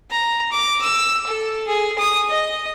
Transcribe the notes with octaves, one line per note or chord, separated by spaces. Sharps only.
A#5
D6
E6
A4
G#4
D#6
D#5